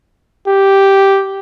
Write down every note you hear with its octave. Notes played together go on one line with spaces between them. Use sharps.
G4